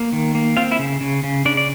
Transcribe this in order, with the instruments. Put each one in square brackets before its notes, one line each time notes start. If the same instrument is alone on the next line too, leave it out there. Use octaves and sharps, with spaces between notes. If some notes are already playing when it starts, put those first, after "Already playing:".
Already playing: [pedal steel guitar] A#3
D#3
A#3
C4 F4 F5
E4 E5
C#3
C#3
C#3
C#3 D4 D5
D5